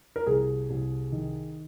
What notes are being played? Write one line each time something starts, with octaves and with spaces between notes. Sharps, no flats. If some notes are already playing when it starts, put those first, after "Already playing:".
A#4
C2 G#4
C2
D#3